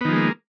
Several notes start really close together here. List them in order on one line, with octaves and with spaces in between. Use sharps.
B3 D#3 F3 G#3 A#3